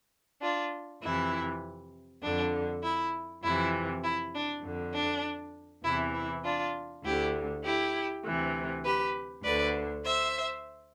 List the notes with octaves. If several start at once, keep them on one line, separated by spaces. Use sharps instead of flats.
D4 F4
F2 C3 E3 E4
F2 D3 D4
E4
F2 C3 E3 E4
E4
D4
F2 D3
D4
E2 C3 E3 E4
E4
D4 F4
D2 D3 E4 G4
E4 G4
D2 C3 E3
G4 B4
D2 D3 B4 D5
C5 E5